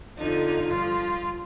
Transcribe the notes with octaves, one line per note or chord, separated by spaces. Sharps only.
F2 D3 F3 D#4
G2 F3 F4